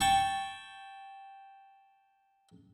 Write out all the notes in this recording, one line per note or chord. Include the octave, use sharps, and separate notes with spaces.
G5 A5 C#6